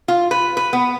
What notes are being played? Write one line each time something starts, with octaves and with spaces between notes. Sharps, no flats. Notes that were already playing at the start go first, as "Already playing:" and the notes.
F4
B4
B4
B3